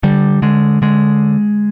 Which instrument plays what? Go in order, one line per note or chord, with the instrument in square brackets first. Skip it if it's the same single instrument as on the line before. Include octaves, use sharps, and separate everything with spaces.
[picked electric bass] D3 G3
D3 G#3
D3 G#3